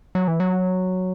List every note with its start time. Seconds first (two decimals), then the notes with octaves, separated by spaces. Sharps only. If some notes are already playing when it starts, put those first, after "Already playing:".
0.15 F#3
0.28 E3
0.40 F#3